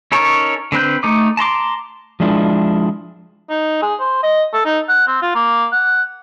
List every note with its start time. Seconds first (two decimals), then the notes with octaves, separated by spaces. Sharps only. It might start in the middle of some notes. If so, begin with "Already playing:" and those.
0.12 C#4 D#4 A4 A#4 C#5
0.72 D3 C4 B4 G6
1.03 A3 D#4 D6
1.37 A5 A#5 C6 D6
2.20 F3 G#3 D4 E4
3.49 D#4
3.82 G#4
4.00 C5
4.23 D#5
4.53 A4
4.65 D#4
4.89 F#5
5.07 C4
5.22 F4
5.35 A#3
5.72 F#5